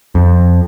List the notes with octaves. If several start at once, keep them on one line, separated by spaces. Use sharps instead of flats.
F2